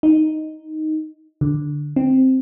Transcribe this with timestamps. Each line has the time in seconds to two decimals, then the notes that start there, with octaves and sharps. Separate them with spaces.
0.03 D#4
1.41 D3
1.96 C4